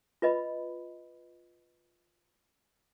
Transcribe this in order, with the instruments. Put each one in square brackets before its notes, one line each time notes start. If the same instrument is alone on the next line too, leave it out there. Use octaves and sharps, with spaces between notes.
[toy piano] F4 B4 D#5 B5